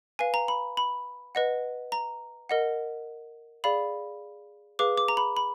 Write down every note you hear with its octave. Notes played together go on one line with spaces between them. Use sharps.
B4 F5 G#5
A#5
B5
B5
B4 D#5 F#5
A#5
A#4 D#5 F#5
G#4 D5 F5 B5
G#4 B4 F5 D6
D6
A#5
B5
B5